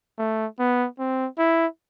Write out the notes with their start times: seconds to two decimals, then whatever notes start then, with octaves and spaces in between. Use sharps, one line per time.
0.19 A3
0.59 B3
0.99 C4
1.39 E4